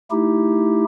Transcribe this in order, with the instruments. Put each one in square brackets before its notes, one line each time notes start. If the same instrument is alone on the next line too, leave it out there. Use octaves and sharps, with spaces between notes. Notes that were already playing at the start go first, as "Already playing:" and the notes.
[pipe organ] A3 D#4 E4 G4